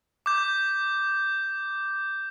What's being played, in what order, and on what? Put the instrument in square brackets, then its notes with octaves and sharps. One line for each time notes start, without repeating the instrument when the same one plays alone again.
[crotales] D6 G6